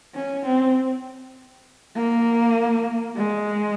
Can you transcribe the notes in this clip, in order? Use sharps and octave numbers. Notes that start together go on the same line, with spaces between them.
C#4
C4
A#3
G#3